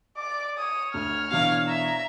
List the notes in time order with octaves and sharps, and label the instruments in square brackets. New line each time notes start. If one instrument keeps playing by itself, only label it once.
[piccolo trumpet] D5 [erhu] D6
[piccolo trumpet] C#5 [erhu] D#6
[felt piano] D2 [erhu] F6
[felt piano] B2 E3 D4 [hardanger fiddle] F5
[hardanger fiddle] E5 [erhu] A#5